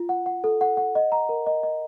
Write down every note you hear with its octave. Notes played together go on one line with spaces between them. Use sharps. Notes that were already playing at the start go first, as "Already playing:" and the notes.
Already playing: F4
F#5
F#5
A4
F#5
F#5
D#5
A#5
A#4
D#5
D#5